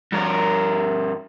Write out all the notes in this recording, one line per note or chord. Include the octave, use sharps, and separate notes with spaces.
G2 A#4